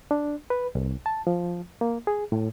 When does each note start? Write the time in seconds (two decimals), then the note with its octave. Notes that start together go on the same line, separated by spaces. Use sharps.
0.11 D4
0.50 B4
0.75 C2
1.06 A5
1.27 F3
1.81 A#3
2.07 G#4
2.32 A2